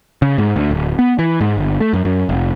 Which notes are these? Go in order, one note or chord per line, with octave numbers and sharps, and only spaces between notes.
C#3
G#2
D2
D1
B3
E3
G#2
G1
A3
F#2
F#2
F1